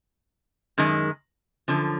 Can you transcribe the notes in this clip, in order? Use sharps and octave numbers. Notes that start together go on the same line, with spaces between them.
F#2 D#3 G#3
F#2 D3 F3